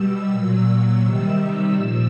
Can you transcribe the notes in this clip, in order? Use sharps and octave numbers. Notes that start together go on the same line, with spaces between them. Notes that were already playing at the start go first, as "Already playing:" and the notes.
Already playing: B2 G3 E6
A#2 F#3 E6
C3 D#3 G3
A#2 F3